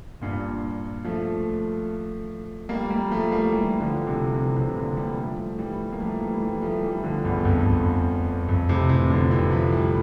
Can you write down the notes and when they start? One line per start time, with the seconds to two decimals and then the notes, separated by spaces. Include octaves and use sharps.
0.21 G2 A#2
1.04 F3 A3
2.69 G3 A#3
2.90 G3 A#3
3.10 F3 A3
3.32 G3 A#3
3.52 E3 G3
3.80 D3 F3
4.07 C3 E3
4.34 C3 E3
4.55 C3 E3
4.76 A#2 D3
4.96 E3 G3
5.18 F3 A3
5.58 E3 G3
5.93 A#3
6.00 F3 A3
6.21 E3 G3
6.42 E3 G3
6.62 F3 A3
6.83 E3 G3
7.04 D3 F3
7.24 E2 G2
7.45 F2
7.66 F2
8.48 F2
8.69 A2 C3
8.89 C3 E3
9.10 D3 F3
9.31 C3 E3
9.51 F3 A3
9.72 E3 G3